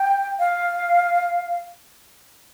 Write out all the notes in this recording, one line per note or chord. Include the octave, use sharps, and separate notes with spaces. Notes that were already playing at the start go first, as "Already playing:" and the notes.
Already playing: G5
F5